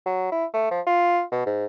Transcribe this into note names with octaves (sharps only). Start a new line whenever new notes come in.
F#3
E4
A3
F3
F4
B2
G#2